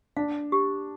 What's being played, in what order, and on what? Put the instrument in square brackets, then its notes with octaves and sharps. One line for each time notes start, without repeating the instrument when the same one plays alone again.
[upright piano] D4 [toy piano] F5
[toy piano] G4